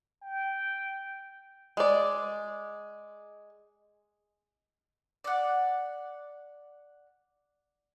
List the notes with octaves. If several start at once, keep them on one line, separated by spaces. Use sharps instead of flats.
G5
G#3 D5
D5 F#5